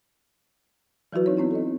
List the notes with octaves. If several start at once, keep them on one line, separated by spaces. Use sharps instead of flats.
E3 F#3 E4 F#4 B4
C4 D#4 C#5
B3 C4 D#4 E4
A4 C#5 D#5